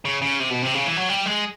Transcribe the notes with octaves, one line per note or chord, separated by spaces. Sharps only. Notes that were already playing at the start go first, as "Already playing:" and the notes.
C#3
C#3
C3
B2
C3
C#3
E3
F#3
G3
G#3